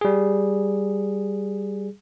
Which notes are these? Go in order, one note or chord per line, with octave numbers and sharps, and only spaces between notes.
G3 G#4